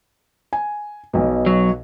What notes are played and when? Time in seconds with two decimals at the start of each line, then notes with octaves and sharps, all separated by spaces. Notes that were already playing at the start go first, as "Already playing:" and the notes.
0.53 G#5
1.13 B1 B2
1.46 F#3